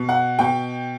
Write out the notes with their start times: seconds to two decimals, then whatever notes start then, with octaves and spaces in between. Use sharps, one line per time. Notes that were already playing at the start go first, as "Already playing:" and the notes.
Already playing: B2
0.09 F#5
0.39 B2 G5